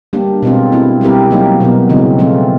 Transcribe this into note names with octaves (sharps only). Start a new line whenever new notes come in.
G3 A#3 D4 G4
B2 G#3 C4 F4
A3 C4 E4
G3 C4 E4 G4 A#4
F#3 A#3 D#4 G4
B2 F#3 B3
C#3 E3 G#3 C4
F3 A3 C4 F4